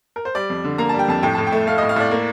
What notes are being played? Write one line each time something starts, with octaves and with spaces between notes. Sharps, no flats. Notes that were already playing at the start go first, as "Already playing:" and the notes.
A#4
C5
G3 D5
F2
D3
A#3 A#5
G3 A5
G5
F2 A5
A2 G5
A2 A5
G5
A3
A3 F5
A2 D#5
F5
A2 D5
A#3